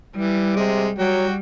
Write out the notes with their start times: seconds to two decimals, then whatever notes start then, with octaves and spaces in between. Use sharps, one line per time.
0.16 E3 G3
0.56 C3 G#3
0.98 F#3 G3 F#4 G5